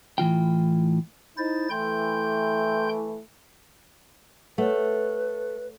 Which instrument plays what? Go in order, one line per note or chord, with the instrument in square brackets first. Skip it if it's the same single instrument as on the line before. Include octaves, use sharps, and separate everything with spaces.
[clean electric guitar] A2 E3 F4 G5
[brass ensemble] D#4 [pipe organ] E4 C5 A6
[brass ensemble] E3 A3 [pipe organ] G5 C6 G6
[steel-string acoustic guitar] A3 [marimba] A4 C#5 F#5 [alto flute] B4